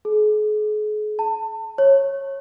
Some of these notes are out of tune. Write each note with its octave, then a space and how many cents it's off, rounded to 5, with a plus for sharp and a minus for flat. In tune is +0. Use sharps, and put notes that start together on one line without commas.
G#4 +40
A5 +30
C#5 -20